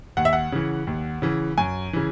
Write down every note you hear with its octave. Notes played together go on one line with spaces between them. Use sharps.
D#2 F#5
E5
F#5
C#3 E3
D#2
C#3 E3
F#2 G#5
C#3 E3